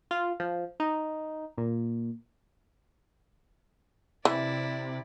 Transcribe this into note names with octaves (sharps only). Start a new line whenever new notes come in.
F4
F3
D#4
A#2
C3 E3 E4 D5